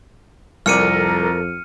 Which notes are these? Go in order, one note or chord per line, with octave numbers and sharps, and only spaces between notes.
C2 F2 A4 A#4 D5 F6 C#7 D#7